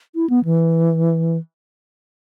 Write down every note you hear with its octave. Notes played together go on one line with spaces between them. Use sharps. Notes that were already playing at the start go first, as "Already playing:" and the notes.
E4
B3
E3